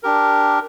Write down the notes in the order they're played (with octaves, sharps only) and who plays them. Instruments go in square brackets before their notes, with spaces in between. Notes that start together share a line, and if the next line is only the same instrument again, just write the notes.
[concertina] D4 G4 A#4